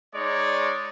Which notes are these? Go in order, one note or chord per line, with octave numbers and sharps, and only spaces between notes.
G#3 D#4 C#5 D5